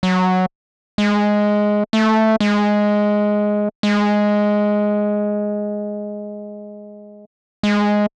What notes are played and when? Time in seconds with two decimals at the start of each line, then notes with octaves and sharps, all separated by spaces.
0.03 F#3
0.98 G#3
1.93 A3
2.40 G#3
3.83 G#3
7.63 G#3